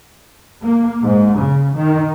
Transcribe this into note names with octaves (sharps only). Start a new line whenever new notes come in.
A#3
G#2
C#3
D#3